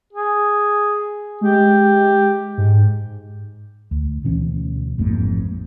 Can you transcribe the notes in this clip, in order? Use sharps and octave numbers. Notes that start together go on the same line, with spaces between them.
G#4
G#3 G4
G#2
D2
D2 B2 E3 C#4
A1 F2 G#2 A#3